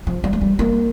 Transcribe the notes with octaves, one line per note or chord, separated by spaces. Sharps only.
F3
G3
A3
G3
A#3